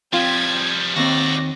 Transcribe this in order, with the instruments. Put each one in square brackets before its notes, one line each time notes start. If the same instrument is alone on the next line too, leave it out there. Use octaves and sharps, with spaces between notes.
[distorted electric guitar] F3 G3 [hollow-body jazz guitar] C4 F4 [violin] G#6
[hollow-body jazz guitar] D#2 C4 [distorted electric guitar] F#4 D5 [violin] A#6